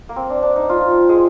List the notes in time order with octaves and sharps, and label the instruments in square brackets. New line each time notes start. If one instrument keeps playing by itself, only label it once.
[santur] A#3
C4
D4
D4
D#4
F3 F4
G#3 G#4